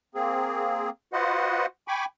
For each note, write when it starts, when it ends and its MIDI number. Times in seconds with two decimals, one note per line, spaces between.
0.15 0.90 58
0.15 0.90 60
0.15 0.90 68
1.13 1.66 65
1.13 1.66 66
1.13 1.66 71
1.13 1.66 72
1.13 1.66 75
1.13 1.66 78
1.88 2.05 79
1.88 2.05 80
1.88 2.05 83
1.88 2.05 85
1.88 2.05 86